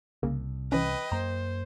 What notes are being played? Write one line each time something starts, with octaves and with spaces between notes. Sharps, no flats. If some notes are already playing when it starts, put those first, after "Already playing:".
C2 C#3 A#3
E3 C#4 B4 D#5 G5
F#2 A#3 C5 A#5